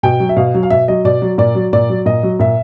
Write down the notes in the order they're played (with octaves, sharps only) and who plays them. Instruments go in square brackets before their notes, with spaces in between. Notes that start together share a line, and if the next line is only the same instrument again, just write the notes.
[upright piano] B2 G5
F#3
E5
B2 F5
F#3
F5
B2 E5
F#3 D#5
B2 D5
F#3
A#2 D5
F#3
A#2 D5
F#3
A#2 D#5
F#3
A#2 E5